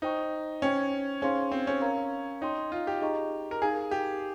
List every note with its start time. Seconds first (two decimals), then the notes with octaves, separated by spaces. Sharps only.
0.02 D#4 C5 G5 C#6
0.62 C#4 C5 G5 C#6
1.22 C#4 D#4 G#4 C5 F5 C6
1.52 C4
1.67 C#4
1.81 A#4 F5 A#5 C#6
2.41 D#4 C#5 G5 C6
2.72 F4
2.87 G4
3.02 D#4 G#4 D#5 A#5 C#6
3.51 A#4
3.62 D#4 G#4 A#4 F5 G#5
3.91 G4